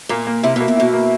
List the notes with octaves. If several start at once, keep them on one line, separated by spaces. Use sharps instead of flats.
A#2 A#3
A#3
C3 E4
B2 A#3
A#2
B2 E4
A#3